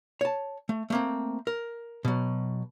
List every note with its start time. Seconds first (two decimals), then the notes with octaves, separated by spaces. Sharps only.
0.21 C#5 A5
0.69 A3
0.90 A3 A#3 C4
1.47 A#4
2.05 B2 F#3